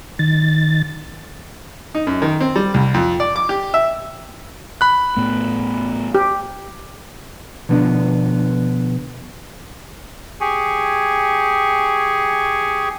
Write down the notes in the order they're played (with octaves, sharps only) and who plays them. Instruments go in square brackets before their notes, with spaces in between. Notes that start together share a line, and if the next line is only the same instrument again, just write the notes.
[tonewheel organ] D#3 A6
[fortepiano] D#4
F#2
D#3
C4
G3
C2
F2
D5
D6
G4
E5
[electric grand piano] B5 F#6
[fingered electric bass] A2 A3 B3
[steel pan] G4
[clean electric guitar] B2 D3 F3 B3 C#4 D4
[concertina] G4 G#4 G#5 C#6